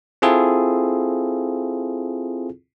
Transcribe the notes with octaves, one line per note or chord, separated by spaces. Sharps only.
C4 E4 F4 G#4 A4